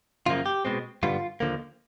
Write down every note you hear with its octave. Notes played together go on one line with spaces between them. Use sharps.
F#2 C#3 F3 A#3 F4
G4
B2 G#3 C4
G2 D3 G3 B3 F4
D#2 D3 F3 A#3